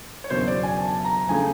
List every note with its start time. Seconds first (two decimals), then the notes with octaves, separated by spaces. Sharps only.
0.24 C#5
0.30 F#1 E2 B2 F#3 A#3 C5
0.47 D5
0.63 G#5
0.80 A5
1.05 A#5
1.29 C#3 F3 A3 G#5